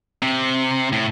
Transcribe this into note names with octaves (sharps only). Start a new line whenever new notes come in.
C3
A2